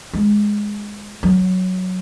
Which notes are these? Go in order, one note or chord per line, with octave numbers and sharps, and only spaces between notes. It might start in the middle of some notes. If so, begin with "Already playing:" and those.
G#3
F#3